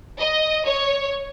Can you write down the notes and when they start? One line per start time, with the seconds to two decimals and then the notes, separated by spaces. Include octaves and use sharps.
0.19 D#5
0.66 C#5